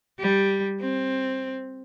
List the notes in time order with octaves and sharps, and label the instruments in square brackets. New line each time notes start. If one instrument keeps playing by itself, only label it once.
[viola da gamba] G3
C4